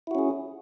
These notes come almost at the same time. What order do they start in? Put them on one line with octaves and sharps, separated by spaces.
E4 F#4 C#4 G#4